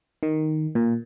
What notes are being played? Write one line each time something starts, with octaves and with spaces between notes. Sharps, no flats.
D#3
A#2